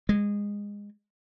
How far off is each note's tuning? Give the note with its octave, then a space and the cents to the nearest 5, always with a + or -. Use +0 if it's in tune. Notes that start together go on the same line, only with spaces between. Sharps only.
G#3 -20